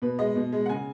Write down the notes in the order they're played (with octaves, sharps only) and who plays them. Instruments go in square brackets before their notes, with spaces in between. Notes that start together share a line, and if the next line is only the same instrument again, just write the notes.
[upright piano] B2 B4
G#3 D#5
B2
G#3
F#5
C#3 G#5